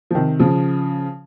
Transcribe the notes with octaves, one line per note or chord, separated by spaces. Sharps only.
F3
C3 D#3
C#3 F3